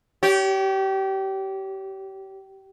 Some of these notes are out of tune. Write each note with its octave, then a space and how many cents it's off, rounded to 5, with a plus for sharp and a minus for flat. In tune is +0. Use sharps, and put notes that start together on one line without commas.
G4 -25 C#5 +30